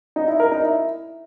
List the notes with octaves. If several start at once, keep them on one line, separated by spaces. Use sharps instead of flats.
D#4
E4
A#4
D#4
E4